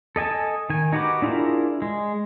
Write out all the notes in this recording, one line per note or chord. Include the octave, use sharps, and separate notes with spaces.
A4 D#5 G#5 A5
D#3 G#5
D#4 F#4 G4 B4 D6
D4 E4 F4 G#4 A#4
G#3